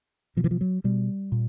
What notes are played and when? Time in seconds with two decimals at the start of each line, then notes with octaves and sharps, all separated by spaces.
0.37 B2 F3
0.44 E3
0.51 F3
0.61 F#3
0.84 B2 G3
1.32 A#2